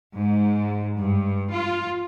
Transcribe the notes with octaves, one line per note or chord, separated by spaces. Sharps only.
G#2
G2
F4